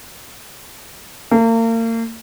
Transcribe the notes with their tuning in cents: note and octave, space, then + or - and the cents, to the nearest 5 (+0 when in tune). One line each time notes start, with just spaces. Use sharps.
A#3 -40